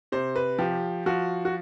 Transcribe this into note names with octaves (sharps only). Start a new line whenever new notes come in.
C3 C5
B4
F3 G4
F3 F#4
F#4